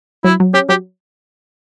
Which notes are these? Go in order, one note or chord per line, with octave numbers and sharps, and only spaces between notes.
F#3 E4
F#3
C#4 G4
F#3 G4